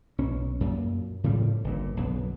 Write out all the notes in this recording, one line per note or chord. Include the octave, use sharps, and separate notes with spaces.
B1 C#4
F#2 A#2
A2 C#3 F3 G3
G1 A#2
B1 F#2 D3 B3